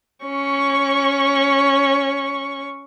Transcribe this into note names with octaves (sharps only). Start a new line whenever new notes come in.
C#4 C#6